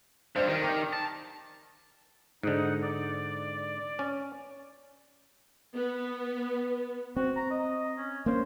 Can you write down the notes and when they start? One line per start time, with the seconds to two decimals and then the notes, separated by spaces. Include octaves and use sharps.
0.36 G2 C5 D5 E7
0.47 D#3 G4
0.62 G5 A#5 D6
0.93 A5
2.43 G#2 D3 D#4 F#5
2.82 D5
3.99 C#4
5.74 B3
7.16 C4 F#4
7.36 A#5
7.51 D#5
7.98 C#4
8.26 A#3 C#4 C5